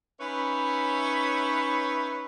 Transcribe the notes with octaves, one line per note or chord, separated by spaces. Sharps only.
C#4 D#4 B4 C#5 E5 B5